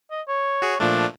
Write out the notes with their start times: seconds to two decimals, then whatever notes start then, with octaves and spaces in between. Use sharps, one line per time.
0.11 D#5
0.28 C#5
0.62 F#4 G#4
0.80 A#2 F3 A3 D4